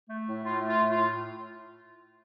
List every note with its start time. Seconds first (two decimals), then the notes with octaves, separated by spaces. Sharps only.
0.09 A3
0.27 A2
0.43 A2 F4
0.60 A3
0.67 F4
0.77 A2
0.89 F4
0.95 A2